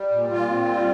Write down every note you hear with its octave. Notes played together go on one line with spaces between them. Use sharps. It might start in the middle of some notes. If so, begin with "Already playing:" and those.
Already playing: G3
A#2
A#2 F4
C4
G3